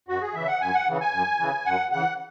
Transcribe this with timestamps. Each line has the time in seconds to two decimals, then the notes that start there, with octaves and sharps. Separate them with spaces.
0.08 F#2 F#4
0.22 G#4
0.34 C#3 E3 E5
0.48 F#5
0.61 F#2 G#5
0.74 F#5
0.88 C#3 E3
1.01 G#5
1.13 F#2
1.39 C#3 E3
1.66 F#2 F#5
1.92 C#3 E3 F#5